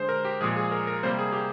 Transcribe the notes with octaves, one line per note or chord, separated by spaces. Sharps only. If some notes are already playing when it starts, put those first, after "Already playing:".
Already playing: D3 G#3 C5
A#4
G4
A#2 F3 G#3 G#4
G#4
A#4
A#4
C3 G3 A#3 C5
G#4
G4